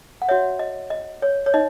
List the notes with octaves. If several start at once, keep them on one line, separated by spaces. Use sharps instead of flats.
F#5
F#4 C#5 E5
D#5
D#5
C#5
C#5
D#4 D#5